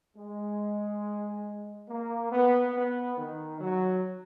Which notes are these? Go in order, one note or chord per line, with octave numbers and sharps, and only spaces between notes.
G#3
A#3
B3
B3
D#3
F#3